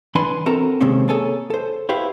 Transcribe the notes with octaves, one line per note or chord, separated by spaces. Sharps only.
E3 D4 B4 G#5 B5 C6
C4 F#4 A4 A#4 A5 A#5
C3 D#3 G#3 A#3 C4 C#4
A#3 G#4 A4 C#5 G#5 A5
A4 C5
E4 F#4 G4 B4 C5 F5